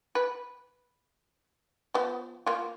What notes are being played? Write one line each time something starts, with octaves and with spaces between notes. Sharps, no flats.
B4
F3 B3
A#3 F4